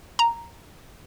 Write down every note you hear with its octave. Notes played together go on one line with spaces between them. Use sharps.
A#5